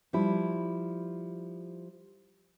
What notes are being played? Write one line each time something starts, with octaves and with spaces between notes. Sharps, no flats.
F3 G3 E4